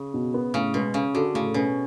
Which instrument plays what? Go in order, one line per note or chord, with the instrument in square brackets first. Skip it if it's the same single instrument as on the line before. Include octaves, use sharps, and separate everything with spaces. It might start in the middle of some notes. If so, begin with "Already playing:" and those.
Already playing: [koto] C#3
[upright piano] B2
B3
[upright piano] A2 [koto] C#3
[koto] B2 [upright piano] G#3
[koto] C#3 [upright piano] C#4
[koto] D3 [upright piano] F#4
[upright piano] A2 [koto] C#3
[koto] B2 [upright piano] C#4